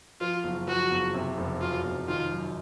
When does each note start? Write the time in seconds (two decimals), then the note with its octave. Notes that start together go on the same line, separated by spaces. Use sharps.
0.21 F3 F4
0.44 F#1
0.68 F3 F#4
0.91 F#1
1.14 C3
1.38 F1
1.61 F#3 F4
1.84 F1
2.08 D#3 F4
2.31 F#2